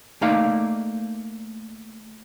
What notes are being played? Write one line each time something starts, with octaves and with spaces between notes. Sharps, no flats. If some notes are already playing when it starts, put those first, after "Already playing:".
A3 A#3 D#4 D5 F5